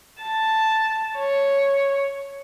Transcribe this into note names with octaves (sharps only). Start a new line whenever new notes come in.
A5
C#5